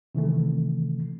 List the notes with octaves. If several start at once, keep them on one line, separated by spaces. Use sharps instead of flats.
C3 D#3 E3 A3